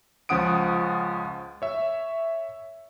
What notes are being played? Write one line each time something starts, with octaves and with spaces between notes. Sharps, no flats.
C#2 F3 C#4 F#5 D#6 D7
C#5 E5